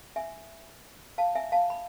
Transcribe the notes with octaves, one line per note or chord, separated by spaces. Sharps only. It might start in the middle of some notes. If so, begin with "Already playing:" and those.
E5 G#5
F5 A5
E5 G#5
F5 A5
B5